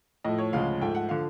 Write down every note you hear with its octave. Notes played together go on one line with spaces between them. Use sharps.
A2 F3 A3 D#5
C#5
D2 C#3 F3 G#3 F5
G#2 F3 A3 G5
F#5
D3 F3 F5